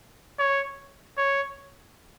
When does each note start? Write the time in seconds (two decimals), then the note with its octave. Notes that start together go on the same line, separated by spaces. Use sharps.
0.39 C#5
1.18 C#5